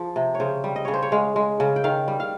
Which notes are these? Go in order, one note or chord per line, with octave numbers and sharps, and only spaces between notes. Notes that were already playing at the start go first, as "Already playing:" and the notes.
Already playing: F3 G#4
C3
C#5
C#3 C5
G3
D#5
C#3 C#5
C5
C#5
G#3 F5
G#3
C#3
G5
D#3 F5
G3
F5